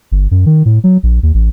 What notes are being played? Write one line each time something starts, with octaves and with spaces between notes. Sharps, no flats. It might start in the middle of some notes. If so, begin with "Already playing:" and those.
G1
F#2
D#3
A2
F#3
A#1
D#2
A1